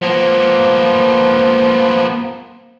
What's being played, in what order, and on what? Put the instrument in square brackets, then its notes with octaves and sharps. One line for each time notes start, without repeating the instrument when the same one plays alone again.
[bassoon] F3 [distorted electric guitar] A#3 B3